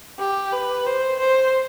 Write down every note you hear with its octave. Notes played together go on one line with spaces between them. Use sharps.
G4
B4
C5
C5